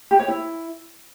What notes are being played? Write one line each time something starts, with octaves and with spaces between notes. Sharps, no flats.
G4
C#5
E4